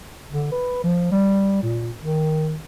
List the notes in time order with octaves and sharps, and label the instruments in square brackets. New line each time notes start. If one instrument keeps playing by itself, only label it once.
[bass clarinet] D3
B4
F3
G3
A#2
D#3